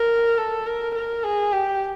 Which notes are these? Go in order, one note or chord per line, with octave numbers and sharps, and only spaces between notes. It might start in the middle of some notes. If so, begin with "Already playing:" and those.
Already playing: A#4
A4
A#4
A#4
G#4
G4